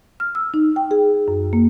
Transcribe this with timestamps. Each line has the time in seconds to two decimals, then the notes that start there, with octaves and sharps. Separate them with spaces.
0.20 F6
0.35 E6
0.54 D#4
0.76 G5
0.91 G#4
1.28 F#2
1.53 A#3